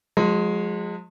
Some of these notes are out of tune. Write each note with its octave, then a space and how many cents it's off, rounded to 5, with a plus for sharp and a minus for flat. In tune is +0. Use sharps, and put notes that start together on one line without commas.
F3 +45 G#3 +0